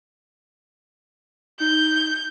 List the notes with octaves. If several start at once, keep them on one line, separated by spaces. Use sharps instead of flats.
D#4 G6